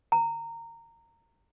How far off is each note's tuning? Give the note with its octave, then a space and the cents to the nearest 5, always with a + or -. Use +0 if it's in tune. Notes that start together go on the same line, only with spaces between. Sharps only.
A#5 -20